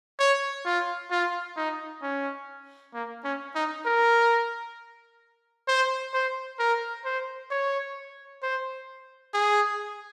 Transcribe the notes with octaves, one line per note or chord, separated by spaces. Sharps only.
C#5
F4
F4
D#4
C#4
A#3
C#4
D#4
A#4
C5
C5
A#4
C5
C#5
C5
G#4